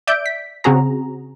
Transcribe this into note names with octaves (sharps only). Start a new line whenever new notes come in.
D5 E5 G6 D7
B6
C#3 C4 F#4 G#4 A#5